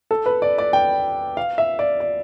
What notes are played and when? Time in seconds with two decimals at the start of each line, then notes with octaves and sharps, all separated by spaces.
0.11 A4
0.26 B4
0.42 D5
0.58 D5
0.73 G5
1.37 F5
1.58 E5
1.79 D5
2.00 D5